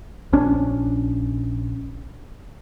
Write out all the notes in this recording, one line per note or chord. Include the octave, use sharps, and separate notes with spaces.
A#1 C#4 D4